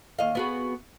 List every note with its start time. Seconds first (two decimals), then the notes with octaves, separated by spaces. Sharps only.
0.19 D#2 D#5 F5
0.35 B3 F#4 G#4